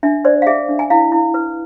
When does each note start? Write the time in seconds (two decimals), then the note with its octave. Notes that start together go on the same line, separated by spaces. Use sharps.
0.03 D4 E5
0.25 C5 D5
0.42 F5
0.47 G#4 E5
0.69 D4
0.79 G#5
0.90 E4 F5
1.12 E4
1.34 B4